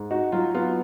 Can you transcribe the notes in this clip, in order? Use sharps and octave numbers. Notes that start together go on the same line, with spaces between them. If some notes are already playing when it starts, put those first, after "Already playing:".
Already playing: G#2
D#4 F#4
F#3 F4
B3 F4